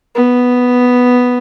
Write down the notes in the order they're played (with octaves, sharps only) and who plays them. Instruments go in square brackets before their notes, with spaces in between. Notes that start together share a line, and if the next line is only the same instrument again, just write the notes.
[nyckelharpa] B3